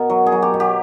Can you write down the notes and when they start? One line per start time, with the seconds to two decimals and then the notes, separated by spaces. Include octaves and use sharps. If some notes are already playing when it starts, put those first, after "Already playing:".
Already playing: B2 A#4
0.10 F#3
0.26 G#4
0.32 F#3
0.42 G4
0.54 B2
0.60 G4